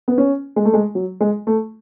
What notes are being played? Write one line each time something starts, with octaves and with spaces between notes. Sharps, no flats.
B3
C#4
G#3
A3
G#3
F#3
G#3
A3